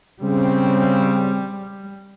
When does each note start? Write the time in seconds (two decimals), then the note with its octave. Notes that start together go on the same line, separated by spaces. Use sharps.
0.22 C#3 G3 C4